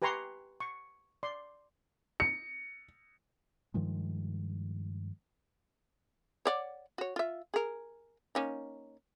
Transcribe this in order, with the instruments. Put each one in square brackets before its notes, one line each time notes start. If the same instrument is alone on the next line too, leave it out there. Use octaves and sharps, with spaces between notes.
[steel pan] G4 B4 G#5 A#5 C6 C#6
C#6
D5 C6
[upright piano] C#7
[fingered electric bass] G2 D#3 F3 G#3
[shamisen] C#5 D5 F#5
F#4 C#5
F4 E5
G#4 A#4
A#3 C#4 D#4